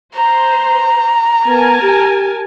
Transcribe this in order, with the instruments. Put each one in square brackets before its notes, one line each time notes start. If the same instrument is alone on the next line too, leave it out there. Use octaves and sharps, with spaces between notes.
[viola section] C5 [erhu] A#5
[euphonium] B3 [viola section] A#4 G#5 A5
[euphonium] G4